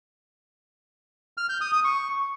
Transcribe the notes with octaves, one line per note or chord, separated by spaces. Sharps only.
F6
G6
D#6
D#6
C#6